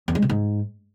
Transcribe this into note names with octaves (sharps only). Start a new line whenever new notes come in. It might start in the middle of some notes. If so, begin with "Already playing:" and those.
E2
G#3
B2
G#2